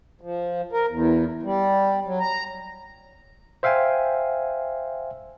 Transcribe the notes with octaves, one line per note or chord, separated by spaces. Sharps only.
F3
A#4
E2
G3
F#3
A#5
C5 E5 F5 G5 G#5